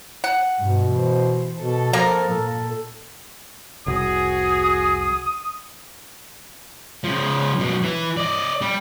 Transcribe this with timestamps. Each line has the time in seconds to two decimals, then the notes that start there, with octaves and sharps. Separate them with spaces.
0.24 F#5
0.60 G2 B2
0.92 E3 C5
1.58 B2 A4
1.93 F3 A#3 A#4
2.29 A#2 A4
3.86 F1 C2 F#4 G#4 D#6
7.04 C#3 F3
7.60 F#2 B2
7.83 E3
8.17 D5 D#5
8.61 G3